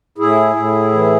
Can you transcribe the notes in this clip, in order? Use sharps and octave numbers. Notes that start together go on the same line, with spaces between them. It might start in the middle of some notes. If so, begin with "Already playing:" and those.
A2 E4 G#4
A2
E3